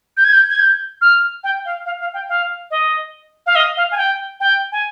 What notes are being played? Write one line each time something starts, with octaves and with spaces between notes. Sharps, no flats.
G6
G#6
G6
G#6
G6
F6
G5
F5
F5
F5
G5
F5
D#5
F5
D#5
F5
G#5
G5
G5
G#5